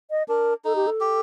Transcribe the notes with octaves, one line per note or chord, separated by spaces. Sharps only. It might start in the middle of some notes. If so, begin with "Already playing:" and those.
D#5
D4 A#4
D#4 A4
G4
A4
G4